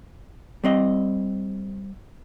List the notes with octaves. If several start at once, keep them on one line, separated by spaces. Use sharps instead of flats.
G3 C4 D#5